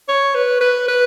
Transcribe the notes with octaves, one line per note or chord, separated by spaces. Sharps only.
C#5
B4
B4
B4